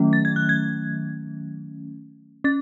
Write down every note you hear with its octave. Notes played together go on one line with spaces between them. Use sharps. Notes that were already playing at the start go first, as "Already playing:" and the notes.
Already playing: D#3 F#3 A3 C#4
A6
G#6
F#6
G#6
C#4 A6